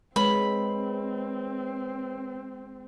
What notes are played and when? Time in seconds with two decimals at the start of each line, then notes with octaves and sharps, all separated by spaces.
0.16 G#3 C4 B4 C#5 B5